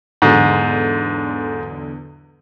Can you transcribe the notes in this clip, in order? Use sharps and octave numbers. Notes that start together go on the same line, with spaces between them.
E2 G#2 D3 F#3